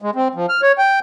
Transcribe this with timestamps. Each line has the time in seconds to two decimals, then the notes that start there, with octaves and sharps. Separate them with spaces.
0.02 G#3
0.15 C4
0.35 F3
0.49 F6
0.62 C#5
0.78 G5